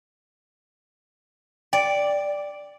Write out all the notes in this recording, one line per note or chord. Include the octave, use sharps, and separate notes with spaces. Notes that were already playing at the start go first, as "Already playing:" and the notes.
D5 G5